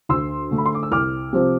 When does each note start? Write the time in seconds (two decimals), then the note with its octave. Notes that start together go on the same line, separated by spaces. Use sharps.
0.09 D2 C6 E6
0.51 D3 A3
0.58 B5
0.66 C6
0.74 D6
0.83 E6
0.91 C2 D6 F6
1.33 C3 F3 C4